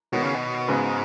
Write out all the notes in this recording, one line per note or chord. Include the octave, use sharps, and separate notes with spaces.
B2 D#3 B3 F#4 C#5
C#3
B2
G#2 C#3 B3 F#4 B4 D#5